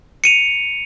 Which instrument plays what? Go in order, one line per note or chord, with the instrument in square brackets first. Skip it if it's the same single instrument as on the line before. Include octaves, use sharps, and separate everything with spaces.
[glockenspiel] C#7 D#7 F7